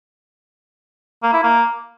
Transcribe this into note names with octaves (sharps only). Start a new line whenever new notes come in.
A#3
E4
A#3